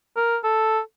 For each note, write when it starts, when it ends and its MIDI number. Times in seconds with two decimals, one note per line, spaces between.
0.17 0.37 70
0.44 0.80 69